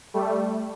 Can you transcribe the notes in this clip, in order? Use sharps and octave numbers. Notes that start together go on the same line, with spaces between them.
G3 A3